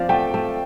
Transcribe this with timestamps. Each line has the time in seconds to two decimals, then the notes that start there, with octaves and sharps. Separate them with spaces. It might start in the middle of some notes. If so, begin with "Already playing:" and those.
Already playing: F3 C4 D5 F5
0.09 A3 G5
0.34 A3